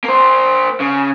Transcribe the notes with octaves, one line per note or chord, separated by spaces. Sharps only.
A#3 C5
C#3